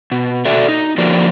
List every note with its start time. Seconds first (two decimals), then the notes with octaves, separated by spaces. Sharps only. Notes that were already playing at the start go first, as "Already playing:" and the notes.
0.12 B2
0.45 F#4 A4 D5 E5
0.68 D#4
0.98 D3 F3 A#3 F#4 A#4 D5